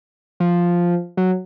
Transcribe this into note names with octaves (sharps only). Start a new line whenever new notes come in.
F3
F#3